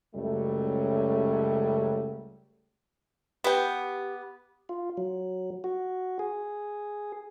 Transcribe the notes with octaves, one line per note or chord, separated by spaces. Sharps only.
C#2 F#2 F#3 G3 A3
B3 G4 G5
F4
F#3
F#4
G#4